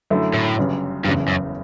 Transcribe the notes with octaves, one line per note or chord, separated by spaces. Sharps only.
F#2 D3 A3 E4
A2
G1 F#2 C#3 G3
F#1 E2 G2 C#3
F#2